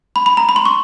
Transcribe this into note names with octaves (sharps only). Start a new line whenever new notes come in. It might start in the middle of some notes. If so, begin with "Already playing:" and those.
B5
B5
A#5
B5
C6
C#6